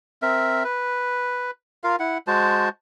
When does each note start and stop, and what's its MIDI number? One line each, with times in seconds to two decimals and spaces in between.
0.22 0.63 60
0.22 0.63 70
0.22 0.63 76
0.64 1.51 71
1.84 1.96 65
1.84 1.96 70
1.84 1.96 77
1.99 2.18 64
1.99 2.18 78
2.27 2.69 56
2.27 2.69 66
2.27 2.69 72
2.27 2.69 81